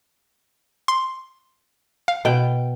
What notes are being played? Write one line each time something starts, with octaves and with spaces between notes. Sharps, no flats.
C6
F5
B2 G5